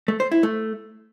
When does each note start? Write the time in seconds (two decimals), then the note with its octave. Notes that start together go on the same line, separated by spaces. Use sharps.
0.08 A3
0.20 C5
0.32 E4
0.43 A3